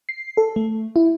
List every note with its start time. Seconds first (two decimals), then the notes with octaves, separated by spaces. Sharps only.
0.09 C7
0.37 A4
0.56 A3
0.96 E4